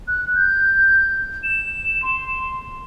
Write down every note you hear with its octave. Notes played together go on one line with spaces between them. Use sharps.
F#6
G6
E7
C6